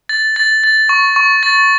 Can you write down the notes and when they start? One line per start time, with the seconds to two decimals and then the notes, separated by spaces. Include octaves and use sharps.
0.09 A6
0.36 A6
0.64 A6
0.89 C#6
1.16 C#6
1.43 A6